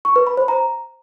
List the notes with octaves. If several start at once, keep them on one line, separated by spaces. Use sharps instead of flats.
C#6
B4
B5
C5
A#5